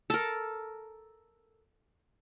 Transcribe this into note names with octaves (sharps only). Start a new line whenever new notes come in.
A4 A#4